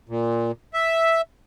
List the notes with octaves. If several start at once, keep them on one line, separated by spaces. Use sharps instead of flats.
A#2
E5